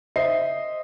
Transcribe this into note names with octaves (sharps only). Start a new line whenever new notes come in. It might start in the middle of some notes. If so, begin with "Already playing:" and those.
C5 D#5 E5 C7